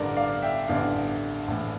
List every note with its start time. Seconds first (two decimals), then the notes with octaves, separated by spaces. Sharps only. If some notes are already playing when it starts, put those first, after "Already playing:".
Already playing: A1 G2 D3 A#4 D5
0.16 D5 F5
0.42 E5 G5
0.68 A1 G2 D3 D5 F5
1.48 A#1 A2 E3